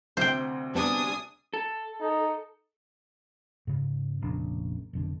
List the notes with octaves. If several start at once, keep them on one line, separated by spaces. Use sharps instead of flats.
D2 C3 C5 G5
G3 B3 D4 G#5 A5 D#6
A4
D#4
G#2 C#3
F1 A#1 C#3 D4
F1 B1 D3